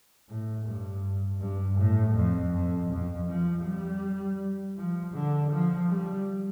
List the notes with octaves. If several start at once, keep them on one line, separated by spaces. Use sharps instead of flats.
A2
G2
G2
A2
F2
F2
F2
F3
G3
F3
D3
F3
G3